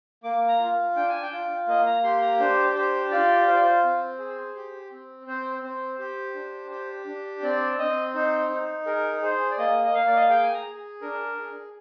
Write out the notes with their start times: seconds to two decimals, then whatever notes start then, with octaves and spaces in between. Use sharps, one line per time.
0.24 A#3 D6
0.48 A#5
0.60 F4
0.96 D4 G5
1.09 G#5
1.22 G5
1.32 F4
1.67 A#3 D#5
1.86 A#5
2.04 G4 C6
2.22 A#5
2.40 D4 C5
2.75 G4 C5
3.11 F4 D5
3.47 F4 C5
3.55 D5
3.63 C5
3.84 C4
4.19 G#4
4.55 G4
4.91 C4
5.27 C4 C5
5.63 C4 C5
5.99 G4
6.35 D4
6.71 G4
7.06 D4
7.43 C4 D5
7.78 C4 D#5
8.14 D#4 C5
8.50 D#4
8.86 G#4 A#4
9.22 G#4 C5
9.51 D5
9.58 A#3 D#5
9.84 D#5
9.94 A#3 F5
10.07 D5
10.15 D#5
10.22 F5
10.29 G#4 G5
10.43 G#5
10.54 A#5
10.66 G#4
11.02 D4 A#4
11.38 G#4